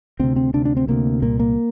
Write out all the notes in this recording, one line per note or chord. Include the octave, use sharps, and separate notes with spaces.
D2 C3 C4
C4
D2 C3 D4
D4
C4
D2 C3 A#3
C2 A#2 A#3
A#3